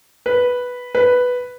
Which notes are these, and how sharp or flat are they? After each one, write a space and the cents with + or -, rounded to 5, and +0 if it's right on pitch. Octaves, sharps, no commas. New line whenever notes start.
B4 -5
B4 +0